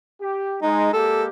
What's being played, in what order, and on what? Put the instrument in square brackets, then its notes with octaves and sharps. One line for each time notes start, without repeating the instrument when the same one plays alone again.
[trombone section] G4
[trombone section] G#3 [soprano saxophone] D#4
[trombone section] G#3 A#3 G4 [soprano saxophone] A4